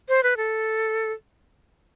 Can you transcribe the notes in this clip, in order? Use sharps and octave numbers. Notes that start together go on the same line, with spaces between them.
C5
B4
A4